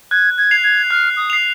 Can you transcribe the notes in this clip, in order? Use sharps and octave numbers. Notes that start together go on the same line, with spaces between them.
F#6 G#6
G#6
C7 F7
G#6
F6 F#6
D#6
C7 F7